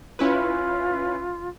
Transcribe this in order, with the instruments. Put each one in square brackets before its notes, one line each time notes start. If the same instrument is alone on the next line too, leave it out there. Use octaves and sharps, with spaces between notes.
[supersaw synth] C#4 E4 B4 [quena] F4